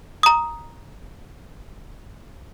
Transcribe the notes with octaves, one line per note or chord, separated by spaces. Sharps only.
A#5 D#6